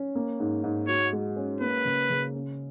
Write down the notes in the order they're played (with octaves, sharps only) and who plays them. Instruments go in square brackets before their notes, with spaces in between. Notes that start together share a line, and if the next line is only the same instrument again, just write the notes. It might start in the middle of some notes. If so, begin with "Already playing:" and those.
Already playing: [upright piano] C#4
A#3
G#2
G#2
[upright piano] F#4 [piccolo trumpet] C#5
[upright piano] G#3
C#4
[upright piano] A#3 [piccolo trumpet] B4
[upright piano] C#3
C#3
C#4